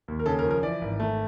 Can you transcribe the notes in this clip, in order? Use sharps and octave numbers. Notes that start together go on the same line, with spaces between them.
D#2
A#4
C#3 A4
A#4
F3
A#4
E3 D5
G#1
A3